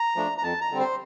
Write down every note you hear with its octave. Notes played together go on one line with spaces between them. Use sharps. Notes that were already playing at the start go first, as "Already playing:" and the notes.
Already playing: A#5
F3 A3 D4
A#5
F2 A5
A#5
D3 G3 C4
C5